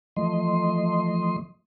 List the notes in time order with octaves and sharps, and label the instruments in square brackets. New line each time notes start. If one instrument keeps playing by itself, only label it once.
[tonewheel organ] E3 F3 A3 D#5 C6